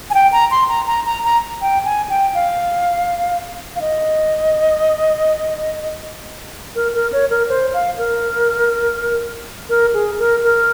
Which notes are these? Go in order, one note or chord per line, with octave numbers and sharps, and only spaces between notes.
G#5
G5
A#5
C6
A#5
A#5
A#5
A#5
G5
G#5
G5
F5
F5
D#5
A#4
A#4
C#5
A#4
C5
F5
A#4
A#4
G#4
A#4
A#4